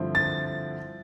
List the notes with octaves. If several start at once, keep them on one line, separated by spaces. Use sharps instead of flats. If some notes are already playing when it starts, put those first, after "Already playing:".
Already playing: G2 D3 F3 C4 E4
A6